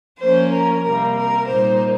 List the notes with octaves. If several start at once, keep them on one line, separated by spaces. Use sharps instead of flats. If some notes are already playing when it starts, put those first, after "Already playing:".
F3 A#3 C#4 C5
A#4
C3 G3 A#3 A#4
A#4
A#2 G3 A#3 D#4 C5